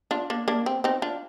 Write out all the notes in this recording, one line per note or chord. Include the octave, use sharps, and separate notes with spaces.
D4 F4
A#3 D4
A#3 D4
C4
C4 D#4
D4 F4